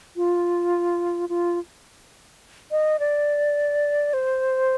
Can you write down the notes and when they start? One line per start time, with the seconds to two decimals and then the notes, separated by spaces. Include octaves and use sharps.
0.16 F4
1.29 F4
2.71 D#5
3.00 D5
4.13 C5